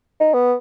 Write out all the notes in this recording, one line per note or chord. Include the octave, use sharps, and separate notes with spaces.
D#4
B3